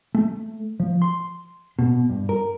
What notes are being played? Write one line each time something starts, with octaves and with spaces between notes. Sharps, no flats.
A3
F3
C6
B2
G2
A#4